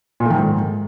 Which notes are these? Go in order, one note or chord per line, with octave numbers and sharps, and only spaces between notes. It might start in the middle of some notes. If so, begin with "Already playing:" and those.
A#2
A3
D#3
G#2